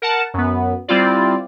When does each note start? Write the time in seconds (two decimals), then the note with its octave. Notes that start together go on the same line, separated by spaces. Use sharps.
0.02 A#4 F#5 A5
0.34 F#2 B3
0.88 G3 C4 E4 F4 D5